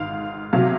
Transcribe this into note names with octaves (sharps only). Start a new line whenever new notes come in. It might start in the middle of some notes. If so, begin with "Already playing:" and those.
Already playing: G#1 G#2 F5
C3 F#3 F5